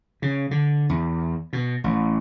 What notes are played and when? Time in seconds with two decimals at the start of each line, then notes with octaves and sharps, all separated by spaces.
0.22 C#3
0.51 D3
0.89 E2
1.53 B2
1.84 A1